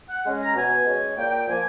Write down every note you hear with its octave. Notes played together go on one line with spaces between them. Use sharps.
F#5
G#3 C#4
A#5
B2 G#5
G#3 C#4
A#2 G5
G5
F3 A#3 G#5